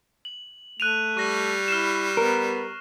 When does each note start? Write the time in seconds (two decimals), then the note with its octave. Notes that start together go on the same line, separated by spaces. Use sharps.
0.25 F#7
0.80 A3 F#6 D#7 F7
1.17 G3 C#6 A#6
1.68 E4 F6 C7 E7
2.17 B3 A#4